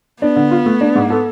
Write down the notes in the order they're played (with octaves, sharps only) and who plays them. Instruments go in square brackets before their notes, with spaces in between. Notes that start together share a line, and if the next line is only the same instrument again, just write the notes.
[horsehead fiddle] B3 [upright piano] D4
[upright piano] D3
F4
A3
D4
G#2
A4